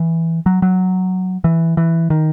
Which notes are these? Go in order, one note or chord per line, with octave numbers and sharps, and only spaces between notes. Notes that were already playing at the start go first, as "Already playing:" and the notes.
Already playing: E3
F#3
F#3
E3
E3
D#3